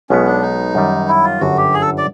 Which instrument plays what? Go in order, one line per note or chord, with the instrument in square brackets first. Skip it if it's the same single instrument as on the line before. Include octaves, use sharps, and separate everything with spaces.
[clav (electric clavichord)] B1 B2 G#3 B3 [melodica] C#4
[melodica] D4
D#4
[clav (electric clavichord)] F#2 D#3 G3
[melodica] E4
F4
[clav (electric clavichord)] G1 F#2 D3 [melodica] F#4
[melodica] G4
G#4
A4
D5